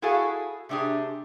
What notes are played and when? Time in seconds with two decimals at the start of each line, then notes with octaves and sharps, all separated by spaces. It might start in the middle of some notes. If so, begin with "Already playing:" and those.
0.02 E4 F#4 G#4 A4 F5
0.69 C3 A3 D4 G4 G#4